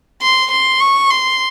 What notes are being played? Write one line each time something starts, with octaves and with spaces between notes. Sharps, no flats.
C6
C6
C#6
C6